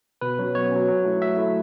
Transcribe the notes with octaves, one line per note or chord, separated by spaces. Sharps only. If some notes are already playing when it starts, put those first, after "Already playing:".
B2 B4
F#3 C#4
B2 C#5
F#3 C#4
F#3
A3 E4
F#3 E5
A3 E4